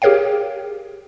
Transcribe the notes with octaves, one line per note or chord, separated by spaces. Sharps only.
G4 G#4 A#4 C#5 F5 G5